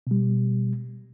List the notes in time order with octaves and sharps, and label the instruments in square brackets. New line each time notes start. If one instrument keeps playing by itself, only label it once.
[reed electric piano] B2 G3